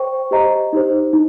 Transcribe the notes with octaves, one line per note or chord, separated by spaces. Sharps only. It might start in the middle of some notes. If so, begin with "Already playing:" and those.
Already playing: C5 G5 C#6
G4 C5 D#5 A#5
D#4 G4 C5
D#4